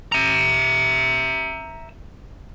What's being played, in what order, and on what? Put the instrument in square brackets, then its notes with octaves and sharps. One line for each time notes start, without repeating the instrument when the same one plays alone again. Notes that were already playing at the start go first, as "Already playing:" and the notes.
[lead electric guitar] E5 A#5